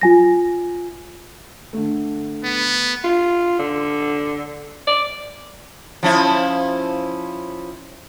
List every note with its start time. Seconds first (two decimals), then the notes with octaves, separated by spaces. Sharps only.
0.01 F4 G#5 A#6
1.73 D3 A3
2.44 B3
3.04 F4
3.59 D3
4.87 D5
6.03 F3 C#4 E4